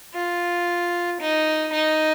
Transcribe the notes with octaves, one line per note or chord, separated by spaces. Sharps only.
F4
D#4
D#4